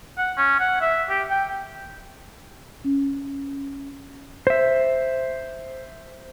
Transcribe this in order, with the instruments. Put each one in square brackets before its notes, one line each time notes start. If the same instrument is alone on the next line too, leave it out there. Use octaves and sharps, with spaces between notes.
[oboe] F#5
C#4
F#5
E5
G4
G5
[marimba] C#4
[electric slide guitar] C5 E5